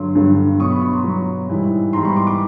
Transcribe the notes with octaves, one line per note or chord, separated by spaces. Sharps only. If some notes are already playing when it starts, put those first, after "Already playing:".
Already playing: G2 D3 F#3 C6
G2 D3 F#3
B2 F#3 C#6 D#6
B5 C#6
B5 C#6
A#5 C6
B2 F#3
G#2 E3 G3
G#2 E3 G3 A#5 C6
B5 C#6
C6 D6
C6 D6